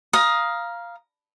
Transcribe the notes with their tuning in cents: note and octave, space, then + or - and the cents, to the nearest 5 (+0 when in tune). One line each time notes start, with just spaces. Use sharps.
F5 -5 A#5 +20 D#6 +0